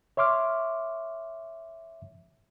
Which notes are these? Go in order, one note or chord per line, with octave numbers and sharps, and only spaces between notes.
C#5 E5 C6 D6 F6